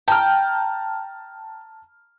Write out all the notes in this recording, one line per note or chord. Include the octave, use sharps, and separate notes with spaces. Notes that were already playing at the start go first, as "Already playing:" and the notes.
G5 A5 A#5 F6